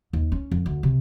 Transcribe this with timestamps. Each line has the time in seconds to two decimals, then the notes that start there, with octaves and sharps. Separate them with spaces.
0.13 D#2
0.32 C#4
0.51 F2
0.66 D2
0.83 C3